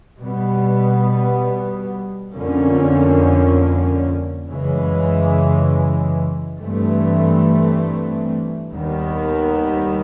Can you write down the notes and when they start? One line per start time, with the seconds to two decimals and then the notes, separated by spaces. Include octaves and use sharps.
0.20 B2 G3 B3
2.33 F2 D3 F3 A#3 C#4
4.46 F#2 C#3 E3 G#3
6.59 G2 E3 A3 C4
8.72 D#2 D#3 G3 B3